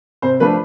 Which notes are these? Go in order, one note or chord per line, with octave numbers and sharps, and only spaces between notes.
C3 C5
F3 A3 D4 B4